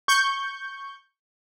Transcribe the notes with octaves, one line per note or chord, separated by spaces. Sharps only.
C#6 G6